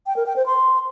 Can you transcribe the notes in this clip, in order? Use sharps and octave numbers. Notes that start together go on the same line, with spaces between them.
G5
A#4
G5
C5
C6